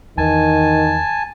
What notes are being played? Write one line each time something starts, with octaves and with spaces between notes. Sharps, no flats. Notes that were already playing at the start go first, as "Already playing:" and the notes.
E2 D#3 G#5 A5